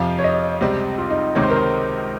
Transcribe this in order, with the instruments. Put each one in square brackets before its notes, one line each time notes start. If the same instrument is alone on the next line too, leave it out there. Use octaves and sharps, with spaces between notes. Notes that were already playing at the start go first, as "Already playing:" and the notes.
Already playing: [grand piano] F2 C3 F3 [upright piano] F5
[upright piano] C#5
D#5
[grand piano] C#2 C3 G3 C4
[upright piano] F4
D#4
[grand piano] C#2 C3 D#3 [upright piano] C#5
[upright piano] C5
A#4
C5